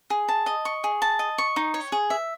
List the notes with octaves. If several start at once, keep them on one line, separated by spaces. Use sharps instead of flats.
G#4
A5
D#5
C#6
G#4
A5
D#5
C#6
D#4
C#5
G#4
E5